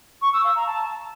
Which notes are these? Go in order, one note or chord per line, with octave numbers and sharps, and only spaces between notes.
C#6
E6
F5
A#5
A5